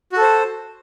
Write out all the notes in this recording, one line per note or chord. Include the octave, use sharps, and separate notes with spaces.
F#4 A4 C5